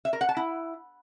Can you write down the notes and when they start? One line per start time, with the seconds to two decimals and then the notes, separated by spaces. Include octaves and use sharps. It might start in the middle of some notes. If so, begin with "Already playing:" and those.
0.05 E5
0.13 A#4
0.21 F#5
0.29 A5
0.37 E4